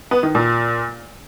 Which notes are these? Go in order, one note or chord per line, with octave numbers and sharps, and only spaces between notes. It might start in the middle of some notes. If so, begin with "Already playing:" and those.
B3
D#3
A#2